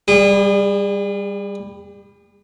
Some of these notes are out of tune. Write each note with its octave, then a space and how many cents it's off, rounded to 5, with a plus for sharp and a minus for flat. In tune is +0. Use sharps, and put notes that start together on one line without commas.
G3 +15 G#4 -35